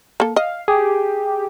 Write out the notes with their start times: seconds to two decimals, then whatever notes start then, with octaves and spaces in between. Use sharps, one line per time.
0.20 A#3 A4
0.36 D#5 F5
0.68 G4 G#4